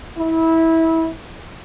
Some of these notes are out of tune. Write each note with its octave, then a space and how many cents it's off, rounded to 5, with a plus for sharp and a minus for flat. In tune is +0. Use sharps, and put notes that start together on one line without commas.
E4 -20